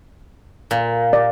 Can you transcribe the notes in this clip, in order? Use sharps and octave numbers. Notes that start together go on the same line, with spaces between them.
A#2
D5